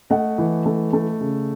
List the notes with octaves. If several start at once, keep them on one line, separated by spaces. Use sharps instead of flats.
A3 D#5 F#5
E3
A3
A3
C#3